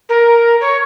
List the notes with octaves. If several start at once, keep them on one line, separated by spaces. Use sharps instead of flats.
A#4
C#5